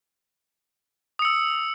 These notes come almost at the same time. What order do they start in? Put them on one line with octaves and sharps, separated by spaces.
D#6 C#7 E6